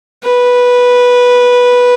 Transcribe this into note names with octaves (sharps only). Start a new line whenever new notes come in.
B4